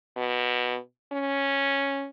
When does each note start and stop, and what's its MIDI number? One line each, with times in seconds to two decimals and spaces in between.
0.17 0.77 47
1.12 2.06 61